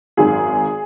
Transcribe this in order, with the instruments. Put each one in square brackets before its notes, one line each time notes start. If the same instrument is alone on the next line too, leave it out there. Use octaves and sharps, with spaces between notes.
[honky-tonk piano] G#1 F#2 D#3 G#4